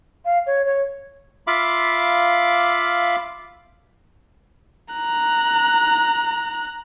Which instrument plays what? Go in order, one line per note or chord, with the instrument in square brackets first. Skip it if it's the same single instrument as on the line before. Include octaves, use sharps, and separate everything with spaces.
[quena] F5
C#5
C#5
[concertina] F4 E5 F5 B5 D6
[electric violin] A#5 F#6